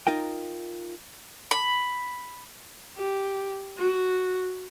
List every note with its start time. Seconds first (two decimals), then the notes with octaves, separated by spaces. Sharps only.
0.07 D#4 F4 A#4 G5
1.51 B5
2.97 G4
3.78 F#4